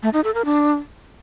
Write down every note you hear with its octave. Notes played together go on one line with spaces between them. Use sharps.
A3
D#4
A4
A#4
D4